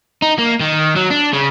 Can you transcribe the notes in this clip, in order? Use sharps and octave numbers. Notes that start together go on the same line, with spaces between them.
D#4
A#3
D#3
F#3
D4
C#3